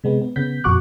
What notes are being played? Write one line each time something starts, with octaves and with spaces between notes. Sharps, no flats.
C3 G#3 B3
B3
C#3 B3 G6 B6
F2 A#2 F#4 C#6 D6 F#6